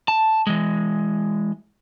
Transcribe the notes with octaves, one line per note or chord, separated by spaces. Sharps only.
A5
E3 G#3